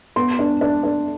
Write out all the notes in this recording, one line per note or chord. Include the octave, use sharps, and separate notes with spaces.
B3 C6
D4
D4
D4